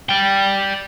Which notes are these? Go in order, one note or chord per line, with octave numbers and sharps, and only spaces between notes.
D5 G5